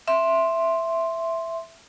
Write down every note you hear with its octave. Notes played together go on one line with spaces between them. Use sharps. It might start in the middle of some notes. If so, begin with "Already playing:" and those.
E5 C6